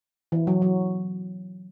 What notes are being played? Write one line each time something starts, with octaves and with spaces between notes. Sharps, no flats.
E3
F#3
F#3